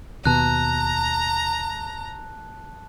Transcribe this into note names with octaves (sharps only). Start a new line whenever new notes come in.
D#2 B2 A5 A#5 F#6